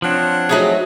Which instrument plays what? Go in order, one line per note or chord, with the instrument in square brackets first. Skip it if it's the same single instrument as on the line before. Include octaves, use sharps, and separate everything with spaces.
[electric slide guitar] F3 C4 [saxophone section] D4 C#5 F#5
[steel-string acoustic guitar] F#3 A3 D#4 [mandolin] G#4 A#5 F#6